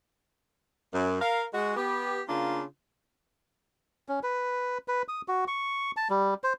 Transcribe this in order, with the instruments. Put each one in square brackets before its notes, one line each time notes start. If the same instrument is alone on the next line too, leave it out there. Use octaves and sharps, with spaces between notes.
[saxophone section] F#2
A#4 F5
G#3 F#4
B3 G4
C#3 A#3 D4 F4
[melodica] C#4
B4
B4
D#6
F#4
C#6
A5
G3
C5